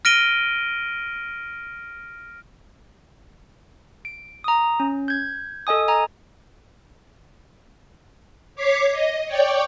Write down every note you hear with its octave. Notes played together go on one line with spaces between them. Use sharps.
F6 A#6 D7 D#7 G7
D7
A#5 D#6
C#4
G6 G#6
A4 D#5 G#5 D#6
G#5 A#5
C#5 D6 B6 C7
D#5
C#5 D5 G5